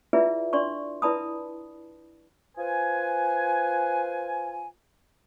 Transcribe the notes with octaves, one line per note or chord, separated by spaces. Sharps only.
E4 F4 G#4 B4 D5 E5
D4 D5 C6 C#6
E4 B4 D5 A5 B5 D#6
F4 B4 C5 G#5